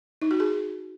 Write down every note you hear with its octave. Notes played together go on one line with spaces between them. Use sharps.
D#4
F#4
G#4